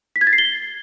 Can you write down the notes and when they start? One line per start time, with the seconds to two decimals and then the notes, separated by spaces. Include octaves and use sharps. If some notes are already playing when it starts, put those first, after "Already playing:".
0.16 B6
0.21 G#6
0.27 A6
0.33 C7
0.38 G7